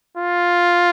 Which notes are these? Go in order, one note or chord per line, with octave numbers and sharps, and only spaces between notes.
F4